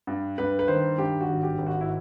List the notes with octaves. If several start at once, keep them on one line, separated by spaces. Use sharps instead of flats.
G2
G2 B4
B4
D#3 C5
G2 G4
F#4
G#1
G4
G#1
F#4
E4